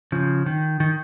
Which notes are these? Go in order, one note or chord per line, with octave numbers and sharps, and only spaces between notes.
C#3 F3
D#3
D#3